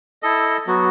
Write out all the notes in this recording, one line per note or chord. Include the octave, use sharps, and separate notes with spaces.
E4 A4 D#5
F#3 B3 F#4